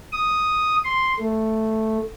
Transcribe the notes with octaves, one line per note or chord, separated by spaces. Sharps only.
D#6
C6
A3